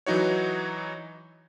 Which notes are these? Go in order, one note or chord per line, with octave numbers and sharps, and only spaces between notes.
E3 F#3 D#4 F#4 C#5